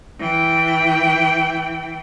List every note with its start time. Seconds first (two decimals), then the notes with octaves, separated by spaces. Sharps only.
0.20 E3 G5